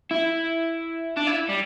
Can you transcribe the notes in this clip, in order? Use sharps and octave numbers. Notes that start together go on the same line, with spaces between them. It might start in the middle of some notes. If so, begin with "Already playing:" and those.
E4
D4
E4
G3